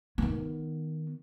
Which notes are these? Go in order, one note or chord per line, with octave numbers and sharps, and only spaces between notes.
D#3 B3